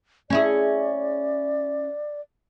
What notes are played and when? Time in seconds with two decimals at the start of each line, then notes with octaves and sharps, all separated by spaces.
0.30 C#4 E4 G#4 D5